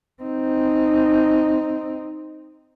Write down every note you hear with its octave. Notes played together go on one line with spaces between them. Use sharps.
C4 D#4